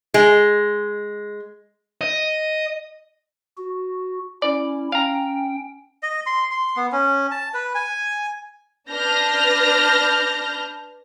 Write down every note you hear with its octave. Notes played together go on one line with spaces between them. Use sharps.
G#3
D#5
F#4
C#4 E4 D5
C#4 F5 G5 A#5
D#5
C6
C6
B3
C#4
A5
B4
G#5
D4 B4 A5 F6 G6 A#6